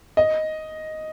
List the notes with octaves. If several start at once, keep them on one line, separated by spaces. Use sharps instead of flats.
D#5